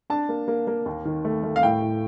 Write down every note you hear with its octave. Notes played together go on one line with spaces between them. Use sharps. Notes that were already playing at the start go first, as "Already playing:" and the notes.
D4 A5
A#3
A#3
A#3
D#2
D#3
A3
A3
F5
A2 G5
A2